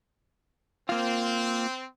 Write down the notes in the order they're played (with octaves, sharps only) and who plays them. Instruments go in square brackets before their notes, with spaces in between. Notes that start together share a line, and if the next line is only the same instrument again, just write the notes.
[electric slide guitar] A#3 F4 [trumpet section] C4